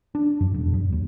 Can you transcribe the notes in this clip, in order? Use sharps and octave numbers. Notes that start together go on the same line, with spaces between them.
D4
F#2
E1
F#2
D#2